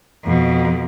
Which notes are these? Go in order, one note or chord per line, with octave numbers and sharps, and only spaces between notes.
F2 B2